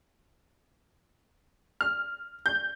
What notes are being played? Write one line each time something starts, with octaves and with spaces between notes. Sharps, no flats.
F6
G6